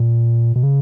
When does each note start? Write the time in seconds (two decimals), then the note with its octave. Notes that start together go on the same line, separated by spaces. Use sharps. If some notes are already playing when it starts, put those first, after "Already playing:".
Already playing: A#2
0.56 B2
0.63 C#3